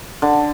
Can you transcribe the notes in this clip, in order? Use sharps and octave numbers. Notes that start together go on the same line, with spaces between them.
D3